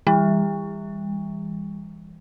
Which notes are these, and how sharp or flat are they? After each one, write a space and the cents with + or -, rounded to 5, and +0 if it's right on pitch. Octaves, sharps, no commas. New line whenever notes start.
E3 +0 G3 +40